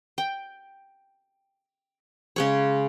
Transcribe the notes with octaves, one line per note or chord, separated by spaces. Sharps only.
G5
C#3 G#3 C#5